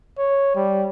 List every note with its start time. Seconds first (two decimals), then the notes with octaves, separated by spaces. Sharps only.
0.18 C#5
0.56 G3